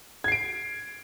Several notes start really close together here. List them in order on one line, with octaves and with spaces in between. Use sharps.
G#6 C7 D7